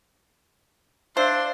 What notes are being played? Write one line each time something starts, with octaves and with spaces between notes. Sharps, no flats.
D4 C5 E5 F5 C6 E6